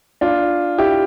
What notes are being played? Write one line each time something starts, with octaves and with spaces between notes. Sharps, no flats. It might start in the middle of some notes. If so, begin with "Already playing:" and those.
D4 F4
E4 G4